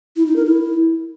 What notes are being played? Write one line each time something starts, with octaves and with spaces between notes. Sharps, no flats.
E4
D#4
A#4
E4